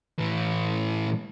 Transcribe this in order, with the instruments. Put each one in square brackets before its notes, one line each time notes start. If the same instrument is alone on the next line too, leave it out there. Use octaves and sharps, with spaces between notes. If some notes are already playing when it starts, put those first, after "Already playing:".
[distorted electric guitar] A2 E3